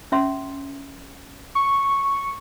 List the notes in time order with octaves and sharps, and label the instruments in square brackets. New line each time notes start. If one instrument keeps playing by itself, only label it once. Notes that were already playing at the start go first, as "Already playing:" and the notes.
[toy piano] C#4 E5 C6
[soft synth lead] C#6